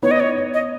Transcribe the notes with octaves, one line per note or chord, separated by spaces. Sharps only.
B3 D#4 C#5
D#5
C#5
D#5